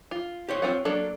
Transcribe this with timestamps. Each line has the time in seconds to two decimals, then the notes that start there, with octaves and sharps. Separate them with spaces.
0.11 F4
0.49 G4 C5 C#5
0.62 C4 F4 F#5
0.85 F#3 A#3 D4 A4